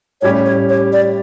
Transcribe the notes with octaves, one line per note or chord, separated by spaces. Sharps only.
A2 G3 C#4 G4 C#5
C#5
C#5
D5